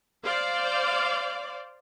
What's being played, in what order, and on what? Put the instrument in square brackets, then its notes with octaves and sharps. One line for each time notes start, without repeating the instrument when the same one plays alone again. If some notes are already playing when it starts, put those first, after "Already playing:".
[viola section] C5 D5 F5